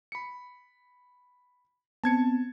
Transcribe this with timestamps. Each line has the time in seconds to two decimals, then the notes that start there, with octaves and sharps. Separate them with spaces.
0.12 B5 C#7
2.04 B3 C4 A5 G#6 C#7